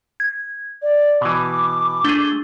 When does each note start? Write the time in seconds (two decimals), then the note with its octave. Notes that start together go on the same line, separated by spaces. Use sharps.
0.20 G#6
0.82 D5
1.21 B2 E3 D6
2.04 A3 D4 G#4 G7